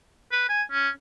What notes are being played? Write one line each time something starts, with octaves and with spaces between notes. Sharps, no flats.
B4
G#5
C#4